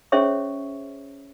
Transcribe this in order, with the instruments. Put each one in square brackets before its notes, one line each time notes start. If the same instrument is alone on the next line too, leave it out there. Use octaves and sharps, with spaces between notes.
[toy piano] C#4 G#4 C5 C#5 E5 C#6